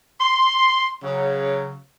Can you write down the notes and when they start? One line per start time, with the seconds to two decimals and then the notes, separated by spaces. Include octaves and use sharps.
0.21 C6
1.04 C#3 F#3